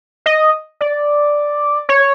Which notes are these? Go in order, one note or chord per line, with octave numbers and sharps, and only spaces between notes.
D#5
D5
C#5